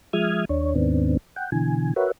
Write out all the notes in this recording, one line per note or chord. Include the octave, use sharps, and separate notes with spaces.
F3 G#3 E5 D#6 F6 G#6
D#2 D4 C#5
D#2 G#2 D#3 B3 C4 D4
F#5 G5
B2 D3 E3 G#5
F#4 A#4 B4 C#5 E5 F#5